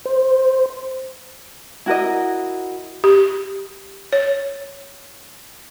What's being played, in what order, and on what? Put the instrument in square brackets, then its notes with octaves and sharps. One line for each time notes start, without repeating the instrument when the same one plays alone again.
[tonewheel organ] C5
[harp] E4 F#4 A#4 D#5
[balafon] G4
C#5